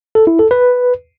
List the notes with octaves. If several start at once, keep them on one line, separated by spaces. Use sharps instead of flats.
A4
E4
A4
B4